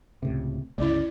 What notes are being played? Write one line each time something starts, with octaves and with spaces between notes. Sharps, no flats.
C#2 A2 C3
G1 C#2 C#3 G#3 E4 D5